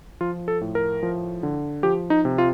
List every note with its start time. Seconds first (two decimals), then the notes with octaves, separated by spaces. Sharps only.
0.21 F3 F4
0.48 A4
0.61 A2
0.75 A#4
1.03 F3
1.43 D3
1.83 F3 G4
2.10 D#4
2.25 C3
2.38 F4